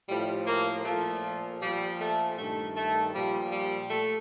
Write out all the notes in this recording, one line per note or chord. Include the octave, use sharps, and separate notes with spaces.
A2 F3 G3
A#3
A#2 F3 A3
A#2 F3 G3
A3
G2 D#3 A3
A3
A#2 F3 G3
G3
A3